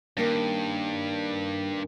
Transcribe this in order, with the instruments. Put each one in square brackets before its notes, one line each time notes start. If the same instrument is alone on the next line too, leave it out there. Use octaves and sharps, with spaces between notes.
[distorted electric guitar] G2 [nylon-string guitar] D#3 A#3 C#4